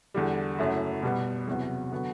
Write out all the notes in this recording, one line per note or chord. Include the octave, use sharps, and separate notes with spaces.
E2 D3 G3
F#1 F#2 F#3 A3 E4
B2 G3 B3
E2 C3 F#3 B3
D3 F#3 B3 F#4